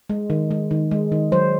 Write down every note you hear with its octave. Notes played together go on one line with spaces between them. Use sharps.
G#3
D#3
G#3
D#3
G#3
D#3
F#3 C5